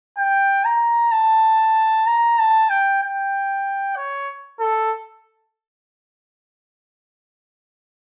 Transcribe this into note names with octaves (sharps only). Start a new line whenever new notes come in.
G5
A#5
A5
A#5
A5
G5
G5
C#5
A4